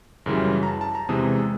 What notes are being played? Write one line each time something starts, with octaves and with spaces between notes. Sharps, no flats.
F#2 C#3 E3 G3
A#5
A5
A5
A#5
E2 C3 E3 G#3 D#6